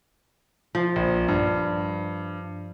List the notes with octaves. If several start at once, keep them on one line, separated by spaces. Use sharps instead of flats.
F3
A#1
G2